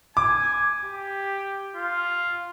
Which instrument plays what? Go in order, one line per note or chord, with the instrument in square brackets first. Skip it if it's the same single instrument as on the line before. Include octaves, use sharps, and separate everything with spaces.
[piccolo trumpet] G#5 [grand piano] D6
[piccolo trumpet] G4
F4